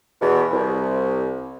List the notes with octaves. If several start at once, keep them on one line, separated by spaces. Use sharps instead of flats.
E2 B2
C2